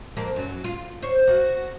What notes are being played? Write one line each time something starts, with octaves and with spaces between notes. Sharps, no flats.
F2 A#3 C4
F#2 F#3
F4
C5 C#5
F#4